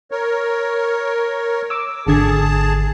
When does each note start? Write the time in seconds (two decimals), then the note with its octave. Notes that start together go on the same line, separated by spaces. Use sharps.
0.11 A#4 C#5
1.70 D6 E6
2.07 G#1 D3 G#4 A5 G#6